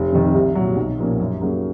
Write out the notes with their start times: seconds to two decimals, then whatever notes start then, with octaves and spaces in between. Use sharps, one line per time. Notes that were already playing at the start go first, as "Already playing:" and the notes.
Already playing: F1
0.12 F2 C3 D#3
0.34 C2
0.55 A#2 F#3
0.76 B1
0.98 A#2 F3 A#3 C#4
1.19 F#2
1.41 C#3 F#3 A#3